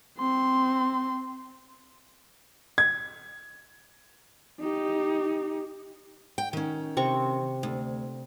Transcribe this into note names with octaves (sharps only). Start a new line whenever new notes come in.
C4 C6
G#6
D#4 G4
G5
D#3 C#4
C3 C4 C#6
D2